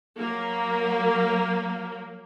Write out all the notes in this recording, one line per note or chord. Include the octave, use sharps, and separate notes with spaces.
F#3 A#3